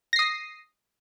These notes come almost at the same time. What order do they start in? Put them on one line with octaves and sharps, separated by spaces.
A#6 C7 D#6